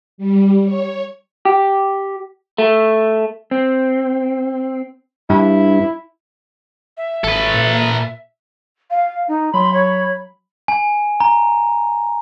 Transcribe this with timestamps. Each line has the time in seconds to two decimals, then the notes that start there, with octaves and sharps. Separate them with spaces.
0.18 G3
0.65 C#5
1.45 G4
2.58 A3
3.51 C4
5.30 G2 E4
6.97 E5
7.24 G#1 A4 B4
7.54 A#2
8.91 F5
9.28 D#4
9.54 F#3 B5 C6
9.74 C#5
10.68 G#5
11.20 A#5